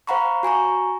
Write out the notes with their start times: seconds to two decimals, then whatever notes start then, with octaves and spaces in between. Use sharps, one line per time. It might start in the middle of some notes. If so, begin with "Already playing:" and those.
0.07 C5 F5 F#5 A#5 B5 C#6
0.43 F#4 G#5 A#5 C#6